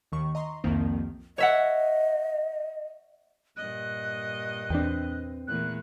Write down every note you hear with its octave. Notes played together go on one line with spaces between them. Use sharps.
D#2 D#3 C#6
D#5 A#5 C6 C#6
C2 F2 D#3 F3 A#3 C4
C#5 D#5 E5 F#5
G2 A#2 D#5 F#6
E2 C4 D4 B4 G5
E2 A#2 A3 F#6